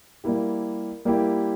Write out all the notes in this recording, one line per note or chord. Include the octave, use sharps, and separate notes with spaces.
G3 A#3 E4 G4
G3 A#3 E4 G4